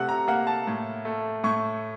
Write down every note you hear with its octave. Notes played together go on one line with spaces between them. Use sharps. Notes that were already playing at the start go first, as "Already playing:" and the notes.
Already playing: C3 A3 F#5
A#5
A#3 F#5
A5
A2
A3
A2 C#6